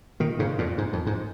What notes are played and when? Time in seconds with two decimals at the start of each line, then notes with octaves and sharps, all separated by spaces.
0.20 A#2 D#3
0.39 G#2 C#3
0.58 F2 A#2
0.78 G#2
0.93 F2
1.07 G#2